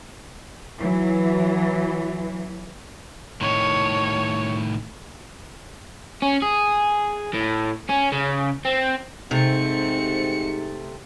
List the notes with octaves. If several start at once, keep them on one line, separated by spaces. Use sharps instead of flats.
E3 F#3
A2 D#3 C#5
C#4
G#4
A2
C#4
C#3
C4
G#2 C3 A3 C4 C#7